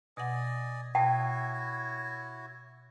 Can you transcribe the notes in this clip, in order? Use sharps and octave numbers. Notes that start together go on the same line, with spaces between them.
B2 D5 D#5 F#5 G#5
B2 E4 F#4 C#5 G5 A5